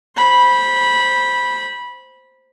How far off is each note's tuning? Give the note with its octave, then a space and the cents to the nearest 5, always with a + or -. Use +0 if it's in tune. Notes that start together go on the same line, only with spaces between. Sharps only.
C5 +0 B5 -15